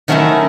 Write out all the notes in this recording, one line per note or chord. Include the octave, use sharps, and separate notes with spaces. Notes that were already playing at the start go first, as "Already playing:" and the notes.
D#3 F#3 A3 C#4 E4